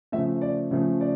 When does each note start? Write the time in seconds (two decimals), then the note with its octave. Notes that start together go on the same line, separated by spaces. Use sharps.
0.12 C#3 F3 A3 E5
0.42 D5
0.71 C#3 F3 A3
1.01 D5